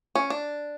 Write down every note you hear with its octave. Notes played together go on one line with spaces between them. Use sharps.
C#4
D4